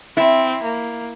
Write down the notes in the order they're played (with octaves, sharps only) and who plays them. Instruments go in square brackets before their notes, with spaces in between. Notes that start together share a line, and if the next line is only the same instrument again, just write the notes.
[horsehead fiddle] C4 [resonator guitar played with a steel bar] E4
[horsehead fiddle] A#3